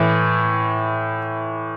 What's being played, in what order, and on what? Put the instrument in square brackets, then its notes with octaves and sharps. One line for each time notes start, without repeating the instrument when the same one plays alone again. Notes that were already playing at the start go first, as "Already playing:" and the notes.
Already playing: [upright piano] A2 E3